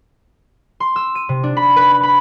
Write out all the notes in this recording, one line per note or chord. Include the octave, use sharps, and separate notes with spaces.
C6
E6
D#7
C3
D4
B5
B4
B5
B5